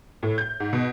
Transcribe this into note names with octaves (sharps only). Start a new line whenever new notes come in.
A2
G6
G#2
B2